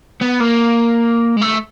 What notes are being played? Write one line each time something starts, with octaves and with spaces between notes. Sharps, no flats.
B3
A#3
G#3
A3